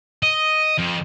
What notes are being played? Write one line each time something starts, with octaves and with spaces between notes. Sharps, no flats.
D#5
F2